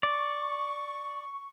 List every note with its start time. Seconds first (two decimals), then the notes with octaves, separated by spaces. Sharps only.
0.03 D5 C#6